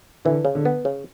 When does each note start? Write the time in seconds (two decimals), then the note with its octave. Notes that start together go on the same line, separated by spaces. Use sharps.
0.25 D3 E3
0.45 C#3
0.55 D3
0.65 B3
0.85 C#3